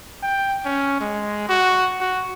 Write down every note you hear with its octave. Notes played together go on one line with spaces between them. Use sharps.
G5
C#4
G#3
F#4
F#4